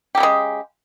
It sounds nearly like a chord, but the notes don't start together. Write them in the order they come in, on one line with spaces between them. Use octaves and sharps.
G4 F#3 C#3 G#3